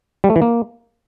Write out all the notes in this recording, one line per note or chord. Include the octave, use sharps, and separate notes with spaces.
G3
A3
E3
A#3